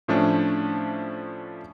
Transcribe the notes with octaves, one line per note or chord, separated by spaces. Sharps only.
A2 F3 A3 C#4 D4